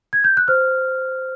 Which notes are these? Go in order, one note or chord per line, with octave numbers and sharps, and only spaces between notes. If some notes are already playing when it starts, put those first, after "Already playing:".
G#6
G6
F#6
C5 F6